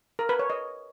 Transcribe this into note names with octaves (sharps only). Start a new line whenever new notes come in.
A#4
B4
C#5
D#5